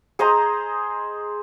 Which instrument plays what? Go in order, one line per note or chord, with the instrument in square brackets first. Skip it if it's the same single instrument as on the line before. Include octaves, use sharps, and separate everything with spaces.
[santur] G#4 C5 D#5 A#5